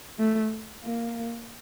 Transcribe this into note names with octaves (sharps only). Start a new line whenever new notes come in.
A3
A#3